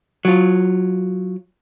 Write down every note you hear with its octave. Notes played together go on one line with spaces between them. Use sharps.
F#3 F4